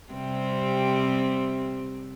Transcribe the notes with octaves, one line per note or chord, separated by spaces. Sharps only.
C3 G3 C4